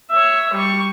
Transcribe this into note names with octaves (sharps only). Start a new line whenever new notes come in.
C#5 E5
G3 C#6